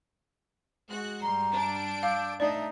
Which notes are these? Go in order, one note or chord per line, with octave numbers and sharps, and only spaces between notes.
G#3 F#4 F#6
G2 G3 A#5 C6
D4 D7
F5 D6 E6 G6
A3 D4 D#4 D5 E5